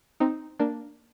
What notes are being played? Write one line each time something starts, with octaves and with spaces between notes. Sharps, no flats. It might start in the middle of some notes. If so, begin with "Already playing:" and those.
C4 D#4
A#3 D4